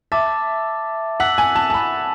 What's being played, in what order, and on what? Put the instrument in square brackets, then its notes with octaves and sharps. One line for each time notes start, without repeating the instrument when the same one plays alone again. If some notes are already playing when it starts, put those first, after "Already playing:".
[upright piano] E5 [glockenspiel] A5 D6 A6
[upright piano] F#5 [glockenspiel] E6 B6 F#7
[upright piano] G#5
A5
A5
B5